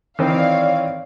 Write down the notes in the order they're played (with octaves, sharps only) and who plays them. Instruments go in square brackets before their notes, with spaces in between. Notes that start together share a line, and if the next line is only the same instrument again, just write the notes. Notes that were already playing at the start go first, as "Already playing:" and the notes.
[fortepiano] D#3 E3 C4 [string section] C#5 D5 F5